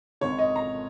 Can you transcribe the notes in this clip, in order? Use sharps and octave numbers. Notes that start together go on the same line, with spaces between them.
G#1 G#2 D#3 C#5
D#5
A#5